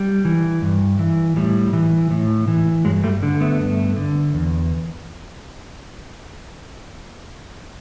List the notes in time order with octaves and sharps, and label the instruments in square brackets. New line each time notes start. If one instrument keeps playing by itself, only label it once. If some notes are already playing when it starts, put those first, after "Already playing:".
Already playing: [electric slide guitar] G3
E3
G2
E3
A2 G3
E3
A2
E3
G2 F#3 G#3
G3 A3
D3
A3 B3
G2
D3
E2